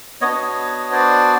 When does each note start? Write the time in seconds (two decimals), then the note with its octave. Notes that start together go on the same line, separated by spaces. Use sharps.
0.21 B3 D4 F#4 C#5 D#5
0.92 C5 D5